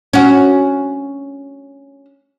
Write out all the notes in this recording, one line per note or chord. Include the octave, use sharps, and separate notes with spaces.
C#4 F#4